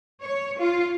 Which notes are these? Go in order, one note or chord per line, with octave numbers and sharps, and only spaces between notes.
C#5
F4